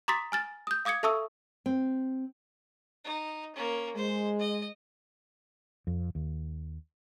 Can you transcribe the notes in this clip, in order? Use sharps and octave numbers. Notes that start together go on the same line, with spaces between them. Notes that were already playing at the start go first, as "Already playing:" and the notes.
A#5 C6 D6 D#6 A6 B6
G#5 F6 A6
D#6 G6
F5 D6 D#6 G#6 C#7
A4 E5 A5 C#6 D#6 E6
C4
D#4
A#3 C#4
G#3 C5
D#5
F2
D#2